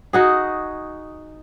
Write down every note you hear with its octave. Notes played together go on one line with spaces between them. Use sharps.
D#4 F#4 G#4